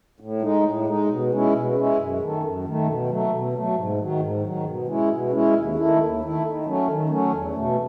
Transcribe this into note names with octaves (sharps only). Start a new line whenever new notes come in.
A2
G#3 D#4
A2
G#3 D#4
B2
G#3 C#4 E4
B2
G#3 C#4 E4
F#2
D#3 A3
F#2
D#3 A3
B2
F#3 A3
B2
F#3 A3
G#2
D#3 F#3
G#2
D#3 F#3
B2
G#3 C#4 E4
B2
G#3 C#4 E4
D#2
D#3 A3 E4
D#2
D#3 A3 E4
D#3
F#3 A3 C#4
D#3
F#3 A3 C#4
E2
B2 A3